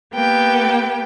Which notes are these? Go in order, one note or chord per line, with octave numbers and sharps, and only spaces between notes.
A#3 B3 G4 G5